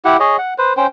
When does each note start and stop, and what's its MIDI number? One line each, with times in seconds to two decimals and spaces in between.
0.05 0.17 64
0.05 0.17 67
0.05 0.17 78
0.20 0.37 68
0.20 0.37 73
0.20 0.37 75
0.38 0.54 78
0.58 0.73 71
0.58 0.73 72
0.77 0.87 61
0.77 0.87 72
0.77 0.87 79